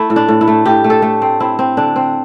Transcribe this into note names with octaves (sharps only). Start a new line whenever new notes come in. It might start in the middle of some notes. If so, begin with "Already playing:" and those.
Already playing: A3 E4
A2
D4
A2
E4
A3
A2 G4
A3
A4
A3
C4
C4 E4
C4
D3 D4
C4